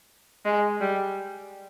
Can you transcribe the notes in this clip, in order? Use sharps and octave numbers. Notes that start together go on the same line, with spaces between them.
G#3
G3